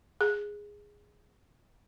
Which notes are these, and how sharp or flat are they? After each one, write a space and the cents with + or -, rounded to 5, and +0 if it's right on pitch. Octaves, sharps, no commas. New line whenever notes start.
G#4 -10